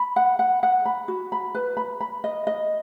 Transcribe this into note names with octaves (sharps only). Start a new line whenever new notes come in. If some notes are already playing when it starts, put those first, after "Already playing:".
Already playing: B5
F#5
F#5
F#5
B5
F#4
B5
B4
B5
B5
D#5
D#5